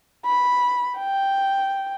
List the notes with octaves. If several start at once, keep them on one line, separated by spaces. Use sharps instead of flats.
B5
G5